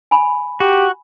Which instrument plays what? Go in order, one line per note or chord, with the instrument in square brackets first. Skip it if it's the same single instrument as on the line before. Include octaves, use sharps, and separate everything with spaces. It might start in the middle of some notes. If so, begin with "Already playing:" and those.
[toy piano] G#5 B5
[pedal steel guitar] F#4 [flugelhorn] G4